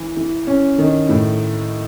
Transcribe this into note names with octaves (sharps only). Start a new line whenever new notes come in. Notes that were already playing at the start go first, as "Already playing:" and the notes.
Already playing: E3
E3
C#4
D#3
A2